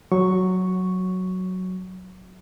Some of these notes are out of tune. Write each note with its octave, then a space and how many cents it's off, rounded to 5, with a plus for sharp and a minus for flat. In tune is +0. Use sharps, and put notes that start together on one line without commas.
F#3 +0 C#6 +0